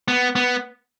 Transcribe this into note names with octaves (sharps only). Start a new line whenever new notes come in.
B3
B3